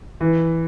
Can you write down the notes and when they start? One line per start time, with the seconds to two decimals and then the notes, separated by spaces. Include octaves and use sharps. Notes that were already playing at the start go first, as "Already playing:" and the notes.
0.21 E3